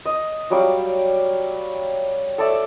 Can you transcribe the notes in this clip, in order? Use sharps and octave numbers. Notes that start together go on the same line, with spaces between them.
D#5
F#3 G3 D5 F5
A4 C#5 D5 E5